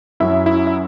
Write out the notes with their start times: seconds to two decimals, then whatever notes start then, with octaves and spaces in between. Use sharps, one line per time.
0.20 F#2 F#3 C#4 E4 E5
0.46 E4 E5
0.67 E5